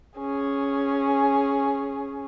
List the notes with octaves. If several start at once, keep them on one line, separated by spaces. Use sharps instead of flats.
C#4 G#4